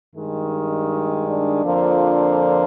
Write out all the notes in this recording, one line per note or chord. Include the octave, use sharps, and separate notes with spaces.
G2 D#3 G#3
D4
F2 D3 F3 A#3